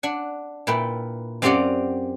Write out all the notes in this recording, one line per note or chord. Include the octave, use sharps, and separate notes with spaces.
D4 F#5
A#2 E4 B4 G5
F#2 C4 F4 G4 D5 F#5